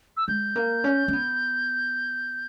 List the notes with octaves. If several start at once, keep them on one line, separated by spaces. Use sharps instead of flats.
E6
G#3 G6
A#3
C#4
C#4
B3